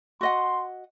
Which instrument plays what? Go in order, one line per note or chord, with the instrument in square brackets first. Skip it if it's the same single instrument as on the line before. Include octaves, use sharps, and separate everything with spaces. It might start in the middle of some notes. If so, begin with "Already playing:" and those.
[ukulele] F#4 D#5 F#5 [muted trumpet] C6